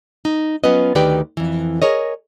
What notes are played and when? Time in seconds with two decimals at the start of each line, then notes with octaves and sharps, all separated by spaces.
0.25 D#4
0.64 F#3 B3 C#4 F4 B4 D#5
0.95 D2 D#3 G4 B4 D5 G5
1.37 F2 E3
1.82 G#4 A#4 C#5 D#5